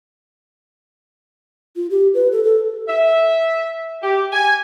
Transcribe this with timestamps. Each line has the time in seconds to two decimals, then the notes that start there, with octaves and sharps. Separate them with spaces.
1.76 F4
1.90 G4
2.14 B4
2.32 A4
2.44 A4
2.88 E5
4.02 G4
4.33 G#5